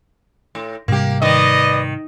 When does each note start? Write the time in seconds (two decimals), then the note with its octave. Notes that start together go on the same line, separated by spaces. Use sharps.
0.55 A2
0.88 G#2 C3 G3 A#3 G4
1.22 D#3 B4 D5 D#5